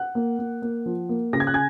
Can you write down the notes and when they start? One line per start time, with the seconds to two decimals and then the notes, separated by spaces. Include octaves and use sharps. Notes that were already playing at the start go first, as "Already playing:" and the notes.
Already playing: F#5 F#6
0.15 A#3
0.39 A#3
0.62 A#3
0.86 F3
1.09 A#3
1.33 C#3 A#6
1.40 G#6
1.47 F#6
1.54 G#5 G#6